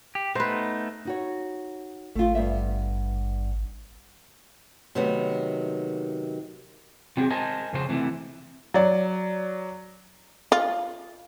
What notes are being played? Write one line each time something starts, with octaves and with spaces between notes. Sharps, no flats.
G4
A3 B3 D#4 B4 C5
D#4 F#4 C#5
G#1 A3 F4
G2 B3 E5
C3 D#3 F#3 A3 B3
C3 F#3 C4 G4 G#4
A#4 C5 D#5 G#5 A5
F2 C#3 C5
C3 E3 A3
F#3 D5
F4